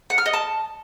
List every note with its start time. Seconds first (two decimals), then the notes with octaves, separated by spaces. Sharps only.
0.10 F#5
0.18 F6
0.26 D#5
0.33 A5